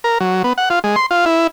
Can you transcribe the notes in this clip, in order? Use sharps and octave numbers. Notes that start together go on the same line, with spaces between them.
A#4
F#3
B3
F#5
F4
G#3
C6
F4
E4